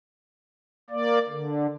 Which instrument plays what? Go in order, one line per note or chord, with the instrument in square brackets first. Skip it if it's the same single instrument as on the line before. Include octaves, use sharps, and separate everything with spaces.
[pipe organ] A#3 D5
D3